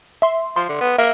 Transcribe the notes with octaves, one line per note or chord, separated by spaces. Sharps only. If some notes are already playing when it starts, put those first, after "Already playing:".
E5 C6
F3 C6
D3
B3
A#3 E5